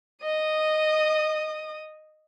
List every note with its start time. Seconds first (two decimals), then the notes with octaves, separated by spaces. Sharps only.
0.23 D#5 D#6